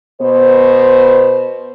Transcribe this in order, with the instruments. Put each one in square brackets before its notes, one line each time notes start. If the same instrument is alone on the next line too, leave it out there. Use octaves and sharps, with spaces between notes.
[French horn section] B2 B3 C5